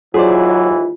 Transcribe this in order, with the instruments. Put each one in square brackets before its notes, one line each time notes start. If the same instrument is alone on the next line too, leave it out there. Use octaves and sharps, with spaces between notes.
[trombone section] D#2 G#2 E3 [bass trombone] F#3 [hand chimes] F4 [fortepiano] G#4 C5 D5